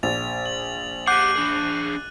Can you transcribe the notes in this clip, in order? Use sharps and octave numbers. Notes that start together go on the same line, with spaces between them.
A#1 A6 F7
F#7
G4 F#5 D6 F#6 G6 C7 D#7
D4 G#4